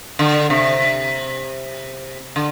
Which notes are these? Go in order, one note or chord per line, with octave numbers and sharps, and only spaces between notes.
D3
C3
D3